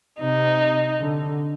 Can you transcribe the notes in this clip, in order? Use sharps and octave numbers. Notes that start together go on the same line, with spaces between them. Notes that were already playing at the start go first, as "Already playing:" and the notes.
C3 D#4
D3